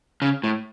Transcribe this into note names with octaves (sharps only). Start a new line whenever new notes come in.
C#3
A2